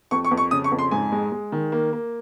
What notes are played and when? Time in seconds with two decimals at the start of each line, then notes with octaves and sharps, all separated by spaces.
0.11 F2 C#6
0.25 C#6
0.31 F2
0.37 C#6
0.51 C#3 D#6
0.64 C#6
0.72 F2
0.79 C6
0.91 G#2 G#5
1.12 G#3
1.32 G#3
1.52 D#3
1.72 A#3
1.93 A#3